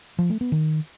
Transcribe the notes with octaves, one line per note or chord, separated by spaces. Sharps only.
F3
A3
B3
D#3